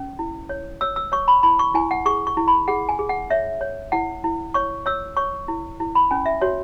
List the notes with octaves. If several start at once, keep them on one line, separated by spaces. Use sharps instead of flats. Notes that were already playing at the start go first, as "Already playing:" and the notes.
Already playing: C#4
E4
C#5
C#5 E6
E6
C#5 C#6
B5
E4 B5
C#6
E4 G#5
F#5
G#4 C#6
C#6
E4
B5
G#4 F#5
G#5
G#4
F#5
C#5 E5
C#5
E4 F#5
E4
C#5 C#6
C#5 E6
C#5 C#6
E4
E4
B5
C#4 G#5
E5
F#4 C#5